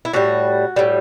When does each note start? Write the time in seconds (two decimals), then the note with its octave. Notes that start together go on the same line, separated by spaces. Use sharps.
0.05 E4
0.13 A2 G3 F#4
0.76 A2 G3